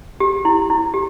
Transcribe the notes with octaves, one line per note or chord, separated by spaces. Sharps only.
G4
E4
E4
G4